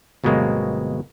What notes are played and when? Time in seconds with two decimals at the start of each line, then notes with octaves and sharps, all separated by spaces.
0.24 G1 B2 F#3 G#3 A#3 C4